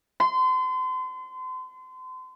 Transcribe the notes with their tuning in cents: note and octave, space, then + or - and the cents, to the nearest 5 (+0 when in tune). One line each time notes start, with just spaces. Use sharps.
C6 -35